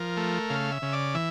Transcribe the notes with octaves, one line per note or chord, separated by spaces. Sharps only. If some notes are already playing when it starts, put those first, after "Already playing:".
Already playing: F3 A#4
A3
C#3 F5
E5
C#3
D5
E3 E5